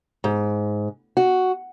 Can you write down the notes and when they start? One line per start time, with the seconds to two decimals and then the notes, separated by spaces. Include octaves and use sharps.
0.24 G#2
1.17 F#4